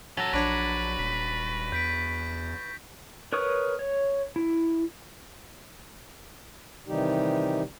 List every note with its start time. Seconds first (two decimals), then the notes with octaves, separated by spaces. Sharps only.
0.17 F#3 C#4 A4 A6 A#6
0.33 A#1 D4 B4 C#5 A#5 C#6 B6 D7
0.99 D#1 B6
1.72 E2 G6 B6 D7
3.33 A#4 B4 C#5 C#6 D#6
3.79 C#5
4.36 E4
6.87 C3 D#3 E3 G3 D#4 G4